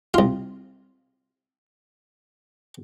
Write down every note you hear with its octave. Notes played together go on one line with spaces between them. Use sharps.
C2 F4